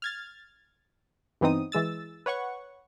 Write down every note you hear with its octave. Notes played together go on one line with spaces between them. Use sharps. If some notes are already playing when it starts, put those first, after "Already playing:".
F6 G#6 A6
G2 E3 B3 C4 D#4 D#6
E3 G#3 E6 A6
B4 C#5 F#5 C#6